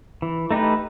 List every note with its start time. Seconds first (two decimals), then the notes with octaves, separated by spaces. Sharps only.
0.22 E3
0.51 A3 D#4 G4 B4